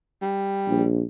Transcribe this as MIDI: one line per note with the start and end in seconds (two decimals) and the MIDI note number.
0.22 0.87 55
0.69 1.04 34